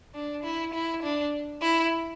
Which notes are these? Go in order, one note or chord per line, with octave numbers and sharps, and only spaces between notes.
D4
E4
E4
D4
E4